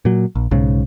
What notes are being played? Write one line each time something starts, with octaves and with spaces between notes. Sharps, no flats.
A#2 F#3
A#1
B1 G#2 C#3